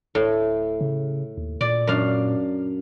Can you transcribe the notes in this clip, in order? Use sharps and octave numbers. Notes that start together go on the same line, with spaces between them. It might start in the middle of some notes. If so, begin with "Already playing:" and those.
D1 A2
C#3
D#2
A#2 D5
F#2 D4 F5